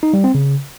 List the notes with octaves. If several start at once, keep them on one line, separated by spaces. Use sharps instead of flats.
D#4
G3
C4
C#3